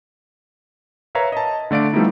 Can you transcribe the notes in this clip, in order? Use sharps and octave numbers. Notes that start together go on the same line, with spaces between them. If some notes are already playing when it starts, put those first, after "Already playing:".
A#4 B4 C#5 E5 F5 A#5
D#5 A5
D3 A3 D5 F5 D7
F3 G3 A3 B3 D#4 E4